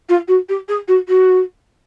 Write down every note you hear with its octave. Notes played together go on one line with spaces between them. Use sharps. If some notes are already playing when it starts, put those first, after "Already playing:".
F4
F#4
G4
G#4
F#4
F#4